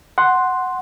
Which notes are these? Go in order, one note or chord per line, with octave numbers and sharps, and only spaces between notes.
F#5 C6